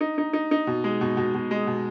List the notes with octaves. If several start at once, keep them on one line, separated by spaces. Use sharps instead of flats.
D#4
D#4
D#4
D#4
B2
G#3
B2
B2
B2
G#3
B2